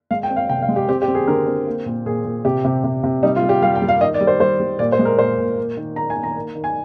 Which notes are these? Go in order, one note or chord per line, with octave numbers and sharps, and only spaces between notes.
G#3 F5
G5
C4
F5
C3 G5
F5
G#3
G4
C4 G4
G4
C4
G#4
D3 A#4
C4
A#3
A#2
A#2 G#4
A#2
C3 G4
C3
C3
C3
G3 D#4
F4
G3
G4
G3 F5
G5
G3
F5
D#3 D#5
D5
G3
C5
G3 C5
G3
A#2 D5
C5
G#3
A#4
A#2 C5
A#2
A#3
D#3
D#3 A#5
G#5
D#3
A#5
A#3
D#3
G#5